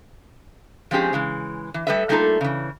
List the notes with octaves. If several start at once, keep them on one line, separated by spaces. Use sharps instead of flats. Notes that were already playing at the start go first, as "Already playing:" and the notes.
F3 G#3 C4 C#4 G4 G#4
C#3 E3 G#3
E3
G3 A3 B4 D#5 E5
G3 A3 A#3 D#4 F4 A4
C#3 E3